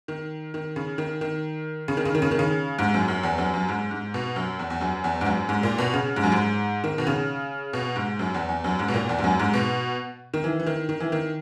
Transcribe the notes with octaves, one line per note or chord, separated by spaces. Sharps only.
D#3
D#3
C#3
D#3
D#3
C#3
D#3
C#3
D#3
C#3
D#3
C#3
G#2
F#2
F#2
E2
F#2
F#2
G#2
G#2
B2
F#2
E2
E2
F#2
E2
G#2
F#2
G#2
A#2
B2
C#3
G#2
F#2
G#2
D#3
B2
C#3
B2
G#2
F#2
E2
E2
F#2
G#2
B2
A#2
E2
G#2
F#2
G#2
B2
D#3
E3
E3
D#3
D#3
E3
D#3